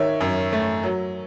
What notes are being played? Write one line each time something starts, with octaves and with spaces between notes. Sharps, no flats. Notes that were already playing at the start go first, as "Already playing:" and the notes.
Already playing: D#3 C#5 E5
F#2
A3
F#3